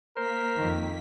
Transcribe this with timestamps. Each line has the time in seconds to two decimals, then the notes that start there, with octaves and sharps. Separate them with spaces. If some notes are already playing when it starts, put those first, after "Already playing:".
0.17 A#3 A#4 C5 B6
0.56 F2 D#3